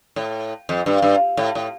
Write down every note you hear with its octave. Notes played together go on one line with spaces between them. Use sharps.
A2
F2
G2
G2
A2
A2